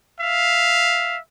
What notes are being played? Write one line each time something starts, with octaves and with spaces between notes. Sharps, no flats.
E5 F5